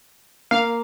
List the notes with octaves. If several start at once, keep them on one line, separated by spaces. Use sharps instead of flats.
A#3 F5